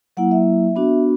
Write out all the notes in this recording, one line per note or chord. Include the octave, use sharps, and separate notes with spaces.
F#3 A#3 E4 F#5
E5
B3 D4 F#4